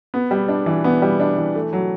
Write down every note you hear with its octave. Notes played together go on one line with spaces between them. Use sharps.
B3
G3
D4
E3
B3
G3
D4
E3
A3
F#3